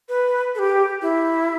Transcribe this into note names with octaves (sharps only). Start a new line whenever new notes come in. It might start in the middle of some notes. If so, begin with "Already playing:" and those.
B4
A4
G4
E4